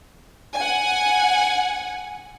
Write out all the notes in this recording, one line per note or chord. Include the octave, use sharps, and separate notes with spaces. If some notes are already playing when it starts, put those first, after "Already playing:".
F#5 G#5